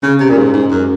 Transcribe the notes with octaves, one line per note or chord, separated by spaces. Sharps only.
C#3 C#4
C3
A#2
G#2
G#2
F#2